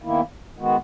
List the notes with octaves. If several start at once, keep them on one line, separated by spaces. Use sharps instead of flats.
E2 D#3 A#3 E4
D#3 G#3 B3 F#4